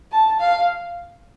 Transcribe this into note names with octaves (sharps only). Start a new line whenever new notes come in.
A5
F5